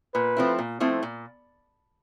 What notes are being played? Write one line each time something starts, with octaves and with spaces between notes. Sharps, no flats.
A#2 B4
F3 A3 C4 E4
A#2
F3 A3 C4 E4
A#2